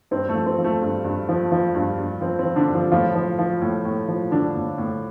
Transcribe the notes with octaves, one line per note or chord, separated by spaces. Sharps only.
G2 C4
A3
F3
C4
F3
A3
G2
G2
F3
F3
G2
G2
F3 C4
C4
F3
D3 D4
G2
F3 F4
A2 F3 F4
F3
F3
A2
A2
F3
D3 F3 D4
A2
A2